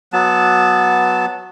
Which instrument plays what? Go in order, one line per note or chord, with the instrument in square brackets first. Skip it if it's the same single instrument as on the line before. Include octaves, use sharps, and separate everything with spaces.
[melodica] F#3 B3 A5